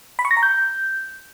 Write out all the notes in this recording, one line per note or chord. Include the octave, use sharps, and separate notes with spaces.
B5
C#6
A#6
A#5
G6